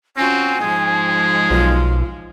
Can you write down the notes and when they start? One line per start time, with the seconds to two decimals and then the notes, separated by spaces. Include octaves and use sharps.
0.17 C4 C#4 F4 F#4 G#5
0.61 G#2 F3 G#3 G#4
1.51 B1 F4